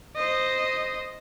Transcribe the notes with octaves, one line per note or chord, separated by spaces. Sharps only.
C5 D#5